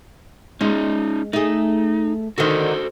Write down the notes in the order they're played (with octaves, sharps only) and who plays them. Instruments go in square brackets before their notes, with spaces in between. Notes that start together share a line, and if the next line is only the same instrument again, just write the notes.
[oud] G#3 [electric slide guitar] C#4 D#4
[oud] A3 G#4 [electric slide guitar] D#4
[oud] D3 D#3 [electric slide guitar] F#4 A4 C5